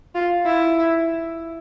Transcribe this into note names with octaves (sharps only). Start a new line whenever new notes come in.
F4
E4